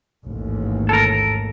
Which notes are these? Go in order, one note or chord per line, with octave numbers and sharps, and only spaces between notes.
A1 D#2 G#2
A4 A#4